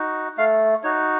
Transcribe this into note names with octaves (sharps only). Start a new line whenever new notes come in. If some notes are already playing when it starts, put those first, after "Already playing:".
Already playing: D#4 F#4
A3 F5
D#4 F#4 C#5